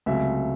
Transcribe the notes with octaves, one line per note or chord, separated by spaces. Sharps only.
C#2 C3 F#3 A3 E5